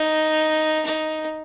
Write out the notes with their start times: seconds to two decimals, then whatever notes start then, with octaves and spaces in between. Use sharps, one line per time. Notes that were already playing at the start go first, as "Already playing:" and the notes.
Already playing: D#4
0.86 D#4